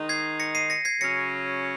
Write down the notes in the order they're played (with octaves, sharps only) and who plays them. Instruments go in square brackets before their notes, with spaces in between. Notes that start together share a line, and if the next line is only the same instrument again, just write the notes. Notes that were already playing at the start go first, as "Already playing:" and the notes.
Already playing: [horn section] D#3 G#3 D#4
[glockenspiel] G#6 C7
A#6 C#7
C7 D#7
A#6 C#7
G#6 C7
[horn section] C#3 F#3 C#4 [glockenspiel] A#6 C#7